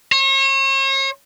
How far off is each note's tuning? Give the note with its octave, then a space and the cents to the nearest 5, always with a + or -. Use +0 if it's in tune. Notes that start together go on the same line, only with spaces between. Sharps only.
C#5 -40